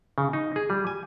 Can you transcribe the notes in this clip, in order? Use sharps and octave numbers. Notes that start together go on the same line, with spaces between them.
C#3
D#4
G#4
G3
G#5